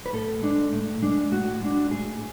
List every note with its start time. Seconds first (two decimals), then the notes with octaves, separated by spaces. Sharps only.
0.06 B4
0.13 A2 A4
0.42 G#3 D4
0.72 A2
1.03 G#3 D4
1.31 A2 F#4
1.61 G#3 D4
1.91 A2 G#4